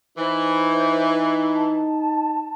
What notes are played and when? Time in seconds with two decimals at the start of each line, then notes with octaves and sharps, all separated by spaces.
0.18 E3 D#4 C5
1.55 A5